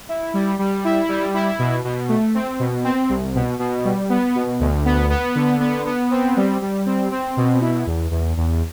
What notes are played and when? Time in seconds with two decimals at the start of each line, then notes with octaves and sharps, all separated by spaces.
0.09 E4
0.34 G3
0.59 G3
0.84 E4
1.09 G3
1.34 E4
1.59 B2
1.85 B2
2.09 A3
2.35 C4
2.59 B2
2.84 C4
3.09 C2
3.35 B2
3.59 B2
3.85 G3
4.09 B3
4.35 B2
4.60 D2
4.85 B3
5.10 B3
5.35 D3
5.60 B3
5.86 B3
6.11 C4
6.36 G3
6.62 G3
6.86 C4
7.12 C4
7.37 B2
7.61 E4
7.86 E2
8.11 E2
8.37 E2